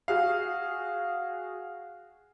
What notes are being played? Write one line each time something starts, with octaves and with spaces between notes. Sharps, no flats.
F#4 G#4 F5